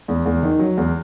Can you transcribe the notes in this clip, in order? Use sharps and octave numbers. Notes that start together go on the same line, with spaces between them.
E2
E2
D#3
F#3
E2